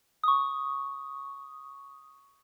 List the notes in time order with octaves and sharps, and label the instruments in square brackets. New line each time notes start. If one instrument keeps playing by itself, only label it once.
[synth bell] C#6 D#6